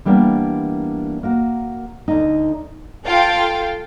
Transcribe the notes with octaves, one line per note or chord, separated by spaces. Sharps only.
E3 G3 A#3 B3 D4
A#3 F#4
D2 D#4
F4 A4 F5 G5